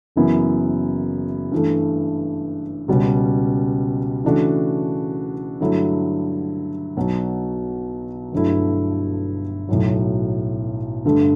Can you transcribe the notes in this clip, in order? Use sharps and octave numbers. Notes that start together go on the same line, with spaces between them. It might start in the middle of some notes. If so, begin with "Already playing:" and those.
F#1 F#2 E3 B3 E4
G2 E3 A3
C#2 B2 G3 C#4
C#3 E3 A3 D4 F#4
G2 D3 F#3 A3 E4
B1 B2 F#3
G1 G2 F#3 A3 E4
B1 A2 F#3
G1 G2 D3 A3